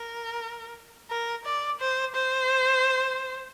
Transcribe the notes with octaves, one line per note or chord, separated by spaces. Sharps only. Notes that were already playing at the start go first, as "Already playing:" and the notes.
Already playing: A#4
A#4
D5
C5
C5